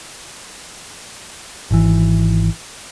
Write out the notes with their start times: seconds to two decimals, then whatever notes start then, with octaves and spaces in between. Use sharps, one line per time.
1.71 G#1 E3